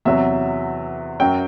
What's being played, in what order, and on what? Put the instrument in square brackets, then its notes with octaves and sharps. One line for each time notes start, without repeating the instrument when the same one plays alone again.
[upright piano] E2 C3 F#3 E5
F#2 F#3 G5